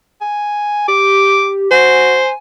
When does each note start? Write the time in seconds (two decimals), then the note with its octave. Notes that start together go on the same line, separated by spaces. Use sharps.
0.21 G#5
0.88 G4 D6
1.71 F#4 C5 G#5